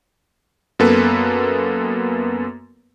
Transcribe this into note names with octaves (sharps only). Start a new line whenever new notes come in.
F#2 A#3 B3 A4 B4